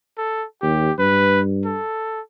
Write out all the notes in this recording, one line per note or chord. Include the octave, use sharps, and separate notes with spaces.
A4
D#2 G4
G2 B4
A4